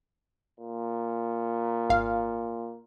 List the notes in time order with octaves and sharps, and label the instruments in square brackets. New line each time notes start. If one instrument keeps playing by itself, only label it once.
[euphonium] A#2
[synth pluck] G#1 F5